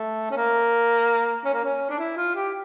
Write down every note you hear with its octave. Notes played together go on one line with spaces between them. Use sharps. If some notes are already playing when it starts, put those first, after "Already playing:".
Already playing: A3
C#4
A#3
C#4
A#3
C#4
D4
E4
F4
G4